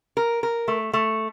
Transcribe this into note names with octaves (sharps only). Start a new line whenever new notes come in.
A#4
A#4
A3
A3